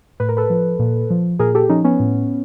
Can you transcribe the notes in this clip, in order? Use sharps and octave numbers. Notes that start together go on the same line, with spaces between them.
A2 B4
A#4
A4 B4
F3
A#2
F3
A#2 G#4 A#4
G4 A4
F3 C#4 D#4
B3 C#4
A2